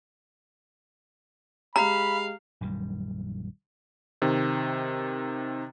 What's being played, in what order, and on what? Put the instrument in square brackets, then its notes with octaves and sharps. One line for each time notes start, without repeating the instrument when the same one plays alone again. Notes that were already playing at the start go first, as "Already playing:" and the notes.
[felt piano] G#3 G4 [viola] F5 [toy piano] A#5 [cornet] B5
[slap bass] A#1 F#2 D#3 G3
[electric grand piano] C3 D#3